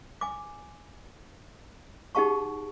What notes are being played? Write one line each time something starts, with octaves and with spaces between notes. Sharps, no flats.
G#5 D6
D#4 G4 G#4 F#5 A5 C#6